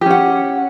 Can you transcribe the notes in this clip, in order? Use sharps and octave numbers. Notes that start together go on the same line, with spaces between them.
C#4 G4 F#5